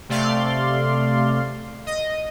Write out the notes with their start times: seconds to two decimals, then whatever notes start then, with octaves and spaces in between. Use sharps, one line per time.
0.09 C3 A3 D5 F5 C6
1.86 D#5